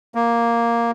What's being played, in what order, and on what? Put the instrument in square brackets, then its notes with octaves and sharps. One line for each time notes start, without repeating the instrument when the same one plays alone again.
[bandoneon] A#3